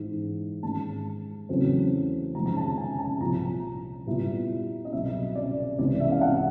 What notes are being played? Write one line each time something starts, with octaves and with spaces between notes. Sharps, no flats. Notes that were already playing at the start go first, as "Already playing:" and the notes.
Already playing: G#2 E3 G#3
G#2 D#3 G#3 A5
E2 C#3 F#3 A3 C4
F2 C3 D#3 G#3 A#5
A#5
A5
G#5
A5
C2 A#2 F3 A#5
A#2 G3 B3 E4
D#5
C2 B2 F#3 E5
D5
C2 C3 E3 G#3 B3 D5
E5
F5
F#5